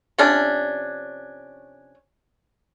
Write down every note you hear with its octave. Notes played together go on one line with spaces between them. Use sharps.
C3 F3 C#4 D4